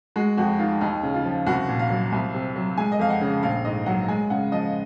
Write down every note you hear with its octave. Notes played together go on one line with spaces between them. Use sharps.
G#3 F#4
F2 F#4
D#3 F4
D#2 D#4
C#3
F4
F3
C2 F#4
A#2
F5
F#3
C2
C3
F#3
G#3 G#5
D#5
F2 F5
F#5
C#3
A#1 F5
G#2 D#5
F#3 F#5
G#3 G#5
C#3 F#5
F3 D#5